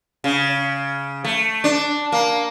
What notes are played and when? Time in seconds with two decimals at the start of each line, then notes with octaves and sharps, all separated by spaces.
0.24 C#3
1.24 A3
1.64 D4
2.12 A#3